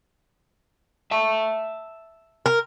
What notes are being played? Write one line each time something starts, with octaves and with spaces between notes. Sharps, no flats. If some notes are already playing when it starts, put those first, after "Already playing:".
E5 A5
A#4